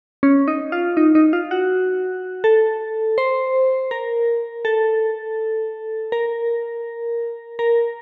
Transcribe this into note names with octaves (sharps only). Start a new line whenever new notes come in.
C#4
D#4
F4
D#4
D#4
F4
F#4
A4
C5
A#4
A4
A#4
A#4